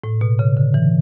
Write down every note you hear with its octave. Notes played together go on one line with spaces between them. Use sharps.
A2
B2
C#3
D3
E3